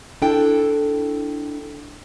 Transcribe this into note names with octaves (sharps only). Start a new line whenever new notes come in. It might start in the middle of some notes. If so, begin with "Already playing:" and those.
D4 E4 A4 G5